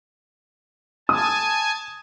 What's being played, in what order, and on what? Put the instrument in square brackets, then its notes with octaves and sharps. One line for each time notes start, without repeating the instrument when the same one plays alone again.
[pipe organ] G#5 A5 [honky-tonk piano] D#6